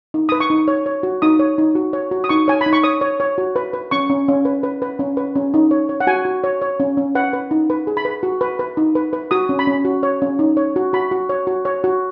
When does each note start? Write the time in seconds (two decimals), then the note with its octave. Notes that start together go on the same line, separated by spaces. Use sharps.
0.14 D#4
0.29 B4 D#6
0.40 C#6
0.50 D#4
0.68 C#5
0.86 C#5
1.03 F#4
1.22 D#4 D#6
1.39 C#5
1.58 D#4
1.75 F#4
1.93 C#5
2.11 F#4
2.24 D#6
2.29 D#4 C#6
2.48 C#5 G#5
2.61 B5
2.66 D#4
2.73 C#6
2.84 C#5 D#6
3.01 C#5
3.20 C#5
3.38 F#4
3.56 B4
3.73 B4
3.91 C#4 C#6
4.10 C#4
4.28 C#4
4.45 B4
4.63 B4
4.82 B4
4.99 C#4
5.17 B4
5.36 C#4
5.54 D#4
5.71 C#5
5.89 C#5
6.00 F#5
6.07 F#4 G#5
6.25 F#4
6.44 C#5
6.62 C#5
6.80 C#4
6.97 C#4
7.15 B4 F#5
7.33 B4
7.51 D#4
7.70 B4
7.87 G#4
7.97 B5
8.05 B4
8.23 F#4
8.41 B4
8.59 B4
8.77 D#4
8.95 B4
9.13 B4
9.31 F#4 D#6
9.49 C#4
9.59 B5
9.67 C#4
9.85 F#4
10.03 C#5
10.22 C#4
10.39 D#4
10.57 C#5
10.76 F#4
10.93 F#4 B5
11.11 F#4
11.29 C#5
11.47 F#4
11.65 C#5
11.84 F#4